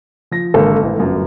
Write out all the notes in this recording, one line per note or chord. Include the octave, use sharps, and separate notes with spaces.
F3 A#6
G#1 D3 A#3 A4 C5
A1
G1 F#2